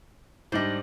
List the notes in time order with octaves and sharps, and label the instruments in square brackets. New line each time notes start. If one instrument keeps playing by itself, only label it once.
[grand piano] G#2 G3 D4 [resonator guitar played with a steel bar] C5 D#5